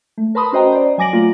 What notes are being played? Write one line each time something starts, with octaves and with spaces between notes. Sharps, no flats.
A3
A#4 B4 A5 B5 C6 D#6
C#4 F#4 C5 D#5 G5 A#5
C5 D5
F#3 G#5 D6 A#6 D7 F#7
A3 A#3 F4